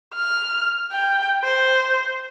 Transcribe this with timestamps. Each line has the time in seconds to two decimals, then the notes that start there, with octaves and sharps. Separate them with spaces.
0.15 F6
0.92 G5
1.44 C5